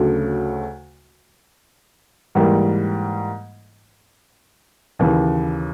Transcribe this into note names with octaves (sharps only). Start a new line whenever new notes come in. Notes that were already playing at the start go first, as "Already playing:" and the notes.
Already playing: D2 C#3 F#3 A3
G#2 E3 G3 A#3
D#2 C#3 E3